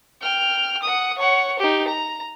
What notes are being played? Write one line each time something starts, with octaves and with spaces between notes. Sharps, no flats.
G5 F6
F#5 D#6
C#5 F#5
D#4 G4
A#5